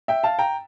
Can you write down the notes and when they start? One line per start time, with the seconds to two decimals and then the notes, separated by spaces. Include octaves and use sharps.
0.08 E5 G5
0.23 F5 A5
0.39 G5 A#5